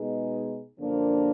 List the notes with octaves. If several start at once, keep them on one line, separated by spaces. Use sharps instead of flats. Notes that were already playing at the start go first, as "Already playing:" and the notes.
Already playing: B2 G#3 D#4 G#4 B4
F#2 D3 F3 A#3 D4